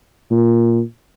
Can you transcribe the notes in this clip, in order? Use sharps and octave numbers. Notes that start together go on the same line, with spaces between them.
A#2